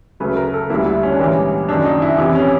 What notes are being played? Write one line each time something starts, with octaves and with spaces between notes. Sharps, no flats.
D2 C#3 F#3 A3 B4
A#4
A4
D2 D3 G3 A#3 E4
E4
C#4
D4
A#1 G#2 E3 G3 A#3 C#4
F#1 F#2 D#3 D4
D#4
E4
F2 C3 E3 E4
C#4